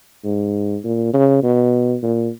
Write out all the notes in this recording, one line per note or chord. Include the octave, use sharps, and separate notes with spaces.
G#2
A#2
C#3
B2
A#2